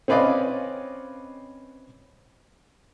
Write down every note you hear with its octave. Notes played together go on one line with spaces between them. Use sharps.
C4 C#4 B4 D5 D#5 F5